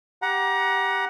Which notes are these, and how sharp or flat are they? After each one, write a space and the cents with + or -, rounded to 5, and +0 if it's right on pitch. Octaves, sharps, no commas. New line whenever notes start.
G4 +0 F#5 +0 A#5 +30